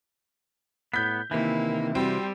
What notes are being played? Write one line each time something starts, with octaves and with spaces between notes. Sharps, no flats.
A2 B3 G6 B6
C3 D#3 E3 A#3 E4
G3 C4 F#4